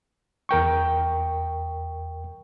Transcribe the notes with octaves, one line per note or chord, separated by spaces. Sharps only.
E2 A#4 G5 C#6